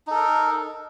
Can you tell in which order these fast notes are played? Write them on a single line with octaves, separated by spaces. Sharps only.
D#4 A4 A#4